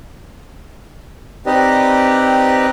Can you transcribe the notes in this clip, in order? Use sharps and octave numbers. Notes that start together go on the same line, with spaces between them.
C4 D#4 G4 B4 D5 D#5